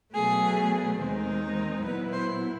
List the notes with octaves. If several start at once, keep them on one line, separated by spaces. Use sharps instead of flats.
B2 F#3 A3 G#4
D#2 D#3 G#3 C4 D#4
A#2 F#3 B3 E4 B4
C5